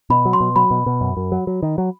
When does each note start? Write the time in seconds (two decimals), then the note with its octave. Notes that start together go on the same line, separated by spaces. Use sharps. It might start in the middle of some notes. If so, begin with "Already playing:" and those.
0.10 B2 B5
0.25 F#3
0.33 C6
0.40 B2
0.56 F#3 B5
0.71 B2
0.86 B2
1.01 F#2
1.17 F#2
1.32 F#3
1.47 F#3
1.63 D#3
1.78 F#3